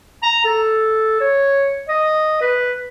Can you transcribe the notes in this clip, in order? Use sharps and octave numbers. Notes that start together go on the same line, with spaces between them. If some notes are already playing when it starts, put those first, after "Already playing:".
A#5
A4
C#5
D#5
B4